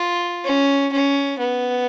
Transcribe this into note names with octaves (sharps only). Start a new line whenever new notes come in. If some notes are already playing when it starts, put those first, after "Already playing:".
Already playing: F4
C#4
C#4
B3